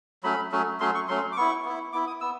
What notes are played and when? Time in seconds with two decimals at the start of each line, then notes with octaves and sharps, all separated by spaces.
0.23 F#3 A3 C#4 B5
0.52 F#3 A3 C#4
0.80 F#3 A3 C#4 C6
0.95 C#6
1.08 F#3 A3 C#4 C6
1.32 D6
1.37 B3 E4 C#6
1.65 B3 E4
1.93 B3 E4 D6
2.07 D#6
2.21 B3 E6